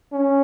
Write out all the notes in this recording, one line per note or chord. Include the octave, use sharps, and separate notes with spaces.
C#4